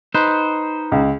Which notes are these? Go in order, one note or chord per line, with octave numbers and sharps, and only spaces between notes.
D#4 B4 C5
C#2